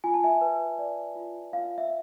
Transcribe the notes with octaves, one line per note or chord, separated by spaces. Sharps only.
F4 G#5
A5
E5 G#5
B4
D5
F4
F4 F5
E5